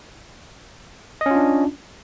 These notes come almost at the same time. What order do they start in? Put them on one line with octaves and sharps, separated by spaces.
D#5 C#4 F4 D4